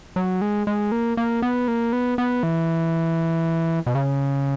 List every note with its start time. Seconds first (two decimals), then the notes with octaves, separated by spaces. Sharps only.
0.16 F#3
0.41 G#3
0.67 G#3
0.92 A#3
1.17 A#3
1.42 B3
1.68 A#3
1.93 B3
2.18 B3
2.43 E3
3.86 B2
3.95 C#3